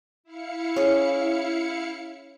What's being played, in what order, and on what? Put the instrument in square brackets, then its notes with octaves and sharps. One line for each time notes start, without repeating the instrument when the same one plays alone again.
[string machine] E4 F5 C#7
[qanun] C#4 G#4